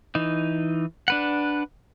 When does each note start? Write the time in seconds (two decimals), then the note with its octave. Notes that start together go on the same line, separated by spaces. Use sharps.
0.15 E3 D#4
1.08 D4 B4 F#5